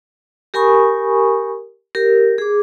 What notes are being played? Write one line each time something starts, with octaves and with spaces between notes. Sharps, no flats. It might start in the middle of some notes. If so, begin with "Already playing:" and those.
G4 A#4 G#5 B5 C#6 D#6
G4 A#4
G#4 D6